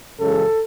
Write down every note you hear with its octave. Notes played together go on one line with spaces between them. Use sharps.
F#2 C#3 E3 G#3 A4